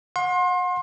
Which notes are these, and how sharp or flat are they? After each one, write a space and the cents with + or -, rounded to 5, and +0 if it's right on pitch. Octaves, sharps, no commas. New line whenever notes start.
F#5 -35 C6 +30